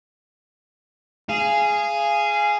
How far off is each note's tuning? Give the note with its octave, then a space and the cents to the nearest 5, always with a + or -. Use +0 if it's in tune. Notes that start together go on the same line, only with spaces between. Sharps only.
G#4 +0 F5 -25